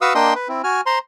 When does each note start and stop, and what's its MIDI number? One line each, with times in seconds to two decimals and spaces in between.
0.01 0.13 66
0.01 0.13 71
0.01 0.13 77
0.01 0.13 85
0.01 0.13 87
0.01 0.13 88
0.15 0.34 58
0.15 0.34 62
0.15 0.34 75
0.15 0.34 79
0.15 0.34 84
0.15 0.34 87
0.35 0.48 71
0.48 0.62 60
0.48 0.62 64
0.64 0.81 66
0.64 0.81 80
0.64 0.81 89
0.86 0.99 72
0.86 0.99 82
0.86 0.99 84